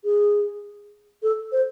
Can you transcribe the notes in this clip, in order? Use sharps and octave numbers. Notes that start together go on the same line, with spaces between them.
G#4
A4
C5